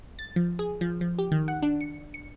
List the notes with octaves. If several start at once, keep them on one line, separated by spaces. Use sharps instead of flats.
A6
F3
G#4
F3
F3
G4
D#3
F#5
D4
C#7
C#7